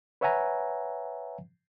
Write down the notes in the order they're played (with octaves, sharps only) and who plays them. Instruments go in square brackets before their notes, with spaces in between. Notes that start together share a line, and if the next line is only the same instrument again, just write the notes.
[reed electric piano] B4 C#5 E5 F#5 G#5 A#5